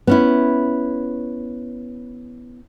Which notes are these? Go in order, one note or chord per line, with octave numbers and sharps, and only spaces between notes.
B3 C#4 E4